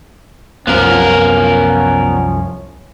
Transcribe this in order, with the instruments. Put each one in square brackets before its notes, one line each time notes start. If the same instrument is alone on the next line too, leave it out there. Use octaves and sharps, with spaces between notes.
[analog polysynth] C2 F#2 F3 [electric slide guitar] B3 A#4 [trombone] C#4